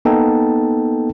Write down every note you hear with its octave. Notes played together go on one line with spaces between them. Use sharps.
A#3 B3 D#4 A4 G5 A5